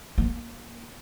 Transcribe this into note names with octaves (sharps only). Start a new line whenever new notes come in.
A#3